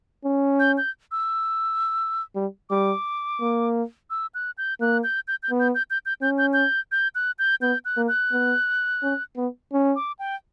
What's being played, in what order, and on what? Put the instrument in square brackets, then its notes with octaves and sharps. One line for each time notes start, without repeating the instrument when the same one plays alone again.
[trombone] C#4
[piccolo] G6
G6
E6
[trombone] G3
[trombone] G3 [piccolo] D6
[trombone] A#3
[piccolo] E6
F#6
G6
[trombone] A#3 [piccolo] F#6
[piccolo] G6
G6
G6
[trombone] B3
[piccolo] G6
G6
G6
G6
[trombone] C#4 [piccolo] G6
[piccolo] G6
G6
G6
F#6
G6
[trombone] B3 [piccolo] G6
[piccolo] F#6
[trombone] A#3
[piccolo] F#6
[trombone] B3
C#4
B3
C#4
[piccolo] D6
G5